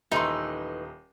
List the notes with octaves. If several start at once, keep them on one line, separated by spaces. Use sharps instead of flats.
D#1 E3 A3 D#4 B4 C6